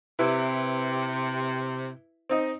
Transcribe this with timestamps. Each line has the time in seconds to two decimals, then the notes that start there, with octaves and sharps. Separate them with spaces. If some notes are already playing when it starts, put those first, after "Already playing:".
0.19 C3 E4 B4
2.29 C4 D#4 D#5